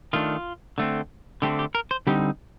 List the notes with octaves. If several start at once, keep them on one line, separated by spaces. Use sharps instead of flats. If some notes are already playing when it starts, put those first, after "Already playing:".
D#3 A3 D4 F4
D3 A3 C4
D3 A3 C4 G4
G4
A#4
C5
D3 G3 C4 D#4 G4